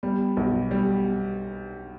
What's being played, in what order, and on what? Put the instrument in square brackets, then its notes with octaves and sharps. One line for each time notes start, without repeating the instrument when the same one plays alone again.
[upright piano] G3 [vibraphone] B3
[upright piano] B1
G3